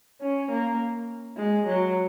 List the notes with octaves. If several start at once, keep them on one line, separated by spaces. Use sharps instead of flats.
C#4
A#3
G#3
F#3